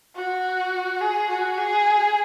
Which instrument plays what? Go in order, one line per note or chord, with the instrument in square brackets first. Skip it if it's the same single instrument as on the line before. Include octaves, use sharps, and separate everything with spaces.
[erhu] F#4
G#4
F#4
G#4